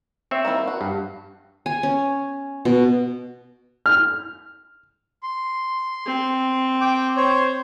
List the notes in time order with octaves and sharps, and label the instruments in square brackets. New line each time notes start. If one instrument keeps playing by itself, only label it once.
[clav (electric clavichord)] C4 C#5 E5
[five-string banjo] D#3 A#3 E4
F#4
[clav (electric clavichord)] G2
[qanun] G#5
C#4
B2
[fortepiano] F6
[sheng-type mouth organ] C6
[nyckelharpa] C4
[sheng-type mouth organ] G5 D6
C5 C#5